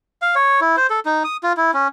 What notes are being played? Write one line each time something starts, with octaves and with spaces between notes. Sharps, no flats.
F5
C#5
E4
C5
A4
D#4
D#6
F4
E4
C#4